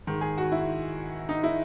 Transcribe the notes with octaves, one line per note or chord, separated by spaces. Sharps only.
G#2 D#3
G#4
F#4
E4
D#4
E4